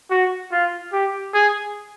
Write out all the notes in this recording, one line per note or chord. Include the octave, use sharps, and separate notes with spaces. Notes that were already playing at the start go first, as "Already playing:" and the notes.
F#4
F4
G4
G#4